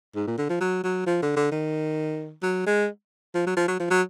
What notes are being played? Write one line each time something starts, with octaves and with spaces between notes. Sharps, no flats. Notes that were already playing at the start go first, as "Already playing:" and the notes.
G#2
A#2
D3
F3
F#3
F#3
F3
D3
D3
D#3
F#3
G#3
F3
F#3
F3
F#3
F3
F#3